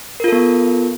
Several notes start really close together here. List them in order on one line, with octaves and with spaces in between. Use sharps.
A#4 F4 A4 B3